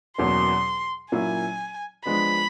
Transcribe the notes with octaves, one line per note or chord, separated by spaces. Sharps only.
E2 B2 F#3 A#3 C#4 C6
A#2 F#3 A#3 C#4 E4 G#5
F3 G#3 B3 D4 B5